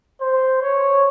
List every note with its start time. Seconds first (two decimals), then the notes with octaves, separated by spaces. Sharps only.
0.21 C5
0.62 C#5